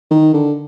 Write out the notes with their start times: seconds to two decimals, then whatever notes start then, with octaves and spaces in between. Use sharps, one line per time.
0.11 D#3
0.33 D3